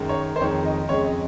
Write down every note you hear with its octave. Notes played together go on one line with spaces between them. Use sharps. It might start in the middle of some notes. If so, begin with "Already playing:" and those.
Already playing: F#2 D#3 G#3
C#5
C5
F2 D#3 G#3 C#5
D#5
F2 C#3 G#3 C#5
D#5